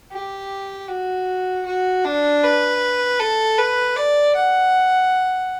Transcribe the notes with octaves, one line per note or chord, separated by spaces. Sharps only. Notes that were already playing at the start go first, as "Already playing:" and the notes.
G4
F#4
F#4
D4
B4
A4
B4
D5
F#5